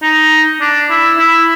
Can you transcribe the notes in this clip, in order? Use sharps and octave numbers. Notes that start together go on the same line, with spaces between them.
D#4
D4
E4
E4